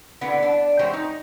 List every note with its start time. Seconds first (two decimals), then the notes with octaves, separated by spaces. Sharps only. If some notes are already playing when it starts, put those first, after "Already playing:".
0.21 D3 B3 E4 F#5
0.43 D4
0.79 E3 G#3 F#4 G4 C5 C#5
0.93 D#4